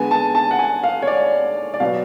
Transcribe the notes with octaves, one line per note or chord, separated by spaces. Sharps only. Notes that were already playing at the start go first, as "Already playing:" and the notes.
Already playing: D3 G#3 B3 G#5
A5
A5
F#5
G#5
F5
C#5
D5
D5
B2 F#3 B3 F5